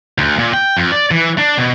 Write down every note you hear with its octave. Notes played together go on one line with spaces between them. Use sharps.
D2
A#2
G5
F2
D5
E3
D4
B2